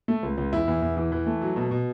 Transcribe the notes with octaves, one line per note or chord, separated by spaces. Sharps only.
A3
C#2
C#2
E2 E4
E2
E2
E3
E3
A3
F#3
B2
B2